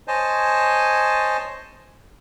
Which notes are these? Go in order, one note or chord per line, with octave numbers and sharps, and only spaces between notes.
C5 C#5 D#5 G#5 A5